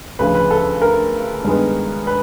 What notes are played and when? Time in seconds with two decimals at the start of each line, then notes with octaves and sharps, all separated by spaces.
0.19 D2 C#3 F3 B4
0.35 B4
0.51 A4
0.82 A#4
1.44 G2 D#3 G#3 B3
2.07 B4